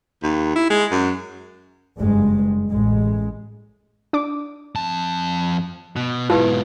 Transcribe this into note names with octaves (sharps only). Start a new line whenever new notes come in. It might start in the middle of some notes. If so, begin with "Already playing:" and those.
D#2
E4
G#3
F#2
F#1 G2 G#3
A1 G#3
D4 D6
F2 A5
B2
G#2 B2 E4 F4 G4 B4 A5